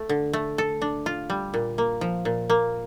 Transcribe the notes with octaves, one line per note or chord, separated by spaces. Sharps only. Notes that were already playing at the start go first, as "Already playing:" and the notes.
Already playing: A3
D3
A3
A4
D4
F4
G3
A#2
A#3
F3
A#2
A#3